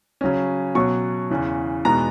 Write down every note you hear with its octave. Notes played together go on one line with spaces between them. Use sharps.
C#3 F#3 C#4
B2 F#3 C#4 C#6
E2 C#3 E3
E2 B2 G#3 B3 D#4 A#5